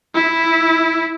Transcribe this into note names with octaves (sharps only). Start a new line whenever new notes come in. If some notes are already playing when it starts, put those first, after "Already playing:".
E4